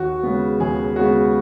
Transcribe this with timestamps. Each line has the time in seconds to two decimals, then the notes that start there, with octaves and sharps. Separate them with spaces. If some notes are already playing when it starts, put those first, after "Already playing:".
Already playing: D#2 F#4
0.23 C#3 G#3 B3
0.60 D#2 G#4
0.96 C#3 G#3 B3 F#4